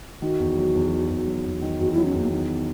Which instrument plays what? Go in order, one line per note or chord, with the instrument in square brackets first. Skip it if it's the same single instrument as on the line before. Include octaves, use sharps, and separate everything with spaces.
[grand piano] D#3 [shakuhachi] F#4
[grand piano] E2
F#3
E2
D#3
E2
F#3
E2
D#3
[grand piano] E2 [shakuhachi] F#4
[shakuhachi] E4
[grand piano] F#3
[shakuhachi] C#4
[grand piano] E2 [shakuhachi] A#3
[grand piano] D#3 [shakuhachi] B3